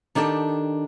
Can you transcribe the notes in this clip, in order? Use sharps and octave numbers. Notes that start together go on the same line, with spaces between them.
D#3 D4 G4 A4 A5